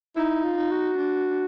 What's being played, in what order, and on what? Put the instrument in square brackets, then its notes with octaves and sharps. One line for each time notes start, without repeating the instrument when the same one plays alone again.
[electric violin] D#4 [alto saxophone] E4
[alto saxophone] F4
[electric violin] D#4
[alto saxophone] F#4
[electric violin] D4